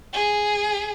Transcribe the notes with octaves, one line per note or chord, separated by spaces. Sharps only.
G#4